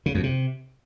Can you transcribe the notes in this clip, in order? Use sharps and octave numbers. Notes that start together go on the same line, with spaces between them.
C#3
F2
C3